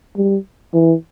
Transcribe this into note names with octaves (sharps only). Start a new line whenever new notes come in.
G3
E3